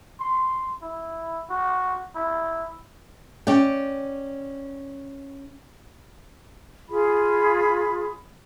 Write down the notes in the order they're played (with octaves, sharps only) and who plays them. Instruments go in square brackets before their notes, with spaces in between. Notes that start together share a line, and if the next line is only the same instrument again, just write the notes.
[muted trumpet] C6
E4
F#4
E4
[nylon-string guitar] C#4 D5 G5
[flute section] F4 G#4 B5